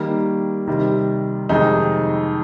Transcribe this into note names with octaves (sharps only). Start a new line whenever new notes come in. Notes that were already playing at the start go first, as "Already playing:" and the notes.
Already playing: D#3 G3 A#3
C3 D#3 G3
F2 C3 D#3 G#3 D#4